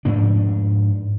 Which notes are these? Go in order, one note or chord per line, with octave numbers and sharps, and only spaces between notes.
G#2 F3 D4